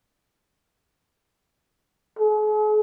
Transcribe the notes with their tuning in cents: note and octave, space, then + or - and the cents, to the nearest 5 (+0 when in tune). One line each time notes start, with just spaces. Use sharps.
G#4 +45